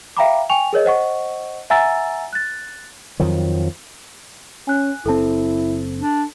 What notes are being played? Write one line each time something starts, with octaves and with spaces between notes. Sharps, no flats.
E5 F5 G5 A#5 B5 D6
G5 G#5 C#6 F7
G#4 A#4 C#5 D#5
C5 D#5 F#5 C#6
E5 F#5 G#5 A#5 E6 A6
F#6 A6
F2 D#3 F3 F#3
C#4 G#5 F#6
F#1 C4 E4 A4 A5
D4